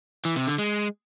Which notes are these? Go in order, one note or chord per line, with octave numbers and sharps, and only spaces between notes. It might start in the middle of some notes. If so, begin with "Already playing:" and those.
E3
C3
D3
G#3